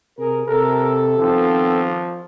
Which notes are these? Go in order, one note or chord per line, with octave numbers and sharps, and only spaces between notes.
C3 G#4 A#4
C3 A4 A#4
D#3 F3 B3 C4